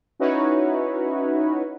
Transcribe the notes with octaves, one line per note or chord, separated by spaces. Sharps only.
C#4 D#4 E4 F#4 B4 C#5